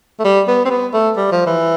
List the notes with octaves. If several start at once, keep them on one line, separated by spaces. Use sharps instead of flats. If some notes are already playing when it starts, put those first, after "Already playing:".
A3
G3
B3
C4
B3
A3
G3
F3
E3